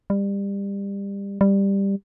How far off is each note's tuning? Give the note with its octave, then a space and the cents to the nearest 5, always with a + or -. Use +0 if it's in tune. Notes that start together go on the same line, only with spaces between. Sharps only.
G3 +25
G3 +10